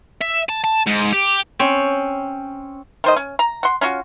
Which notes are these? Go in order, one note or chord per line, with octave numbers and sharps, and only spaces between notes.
E5
A5
A5
G#2
G4
C4 C#4
D#3 C5 D#5
C#4
A#5
F#5 C6
C#4 F4 F#4